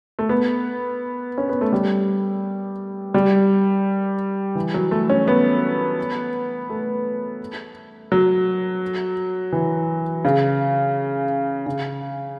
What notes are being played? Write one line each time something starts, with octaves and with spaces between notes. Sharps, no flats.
A3
B3
C#4
B3
A3
G3
G3
E3
F#3
A3
C#4
B3
A3
F#3
E3
C#3
C#3